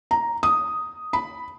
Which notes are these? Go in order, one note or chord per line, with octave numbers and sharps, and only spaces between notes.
A#5
D#6
B5